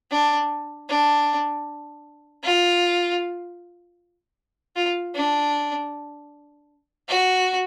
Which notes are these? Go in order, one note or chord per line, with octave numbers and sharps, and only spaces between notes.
D4
D4
F4
F4
D4
F#4